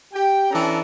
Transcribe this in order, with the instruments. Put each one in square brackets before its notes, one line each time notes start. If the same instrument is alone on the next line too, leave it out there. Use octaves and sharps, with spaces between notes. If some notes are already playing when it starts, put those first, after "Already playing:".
[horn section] G4 G5
E3 C#4 D4 A4 A#5